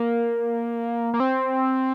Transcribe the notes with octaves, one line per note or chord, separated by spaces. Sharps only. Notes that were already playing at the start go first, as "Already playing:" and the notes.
Already playing: A#3
A#3
C4